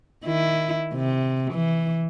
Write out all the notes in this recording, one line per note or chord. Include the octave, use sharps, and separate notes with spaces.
D#3 E4
C3
E3